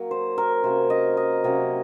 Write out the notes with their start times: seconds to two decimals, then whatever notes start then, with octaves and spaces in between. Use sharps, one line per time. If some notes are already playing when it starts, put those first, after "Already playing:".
Already playing: F#3 A#3
0.11 C5
0.38 A#4
0.64 C3 F#3 A#3 C#4 C5
0.90 D#5
1.17 D#5
1.44 C3 F#3 A#3 C#4 D#5